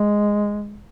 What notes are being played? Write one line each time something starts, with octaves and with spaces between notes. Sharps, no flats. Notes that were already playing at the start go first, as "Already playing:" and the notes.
Already playing: G#3